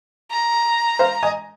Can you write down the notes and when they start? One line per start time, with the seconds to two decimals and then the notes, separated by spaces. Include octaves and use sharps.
0.31 A#5
0.99 C5 F5
1.23 D#5 G#5